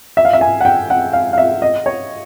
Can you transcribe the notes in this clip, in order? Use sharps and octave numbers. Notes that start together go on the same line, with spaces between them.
E5
F5
E5
G#5
F#5
G5
F#5
F5
F5
E5
D#5
C#5